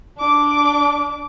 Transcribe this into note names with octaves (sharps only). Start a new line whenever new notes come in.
D4 D6